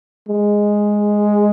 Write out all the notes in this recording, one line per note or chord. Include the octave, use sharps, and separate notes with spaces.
G#3